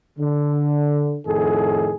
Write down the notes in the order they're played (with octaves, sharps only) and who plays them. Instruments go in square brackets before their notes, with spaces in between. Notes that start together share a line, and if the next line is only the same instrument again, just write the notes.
[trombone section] D3
F2 A2 D#3 G#4 A4